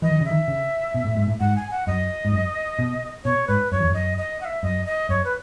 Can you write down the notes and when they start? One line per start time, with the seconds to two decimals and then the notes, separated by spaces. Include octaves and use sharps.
0.02 E3 D#5
0.11 D#3
0.21 C#3 E5
0.31 D#3
0.48 C#3
0.94 B2
1.05 A2
1.17 G#2
1.28 A2
1.40 G#2 F#5
1.56 G#5
1.71 F#5
1.87 F#2 D#5
2.25 G#2
2.32 F#2
2.79 B2
3.24 B2 C#5
3.48 G#2 B4
3.72 F#2 C#5
3.80 E2
3.90 F#2 D#5
4.18 D#5
4.41 F#5
4.45 E5
4.63 F#2 D#5
4.86 D#5
5.09 F#2 C#5
5.24 B4